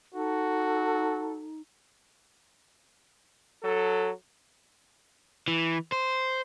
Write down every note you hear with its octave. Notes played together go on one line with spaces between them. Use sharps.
D#4 F#4 A4
F#3 A4
E3
C5